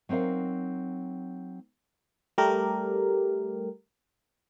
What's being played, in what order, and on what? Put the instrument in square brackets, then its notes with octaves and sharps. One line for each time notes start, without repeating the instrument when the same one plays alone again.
[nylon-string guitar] F#3 C4 D#4 A#4 F5
[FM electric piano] G3 A3 G4 A#4